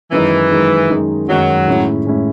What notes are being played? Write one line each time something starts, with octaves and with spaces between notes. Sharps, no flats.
F#2 D#3 E3 G#3 D#4
F#2 D#3 G#3 D#4
F#2 D#3 G#3 D#4
F#2 D#3 F#3 G#3 D#4
A2 G#3 C#4 E4
A2 G#3 C#4 E4